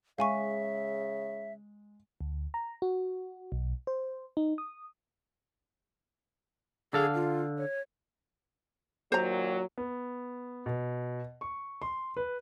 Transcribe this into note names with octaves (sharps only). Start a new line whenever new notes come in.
C#3 G#3 E5 F5 G#5 C#6
D2
A#5
F#4
B1
C5
D#4
D#6
D3 G#4 A4 F5
F4
C#5
D#2 A#2 F#3 C5 A#5
B3
B2
C#6
C6
B4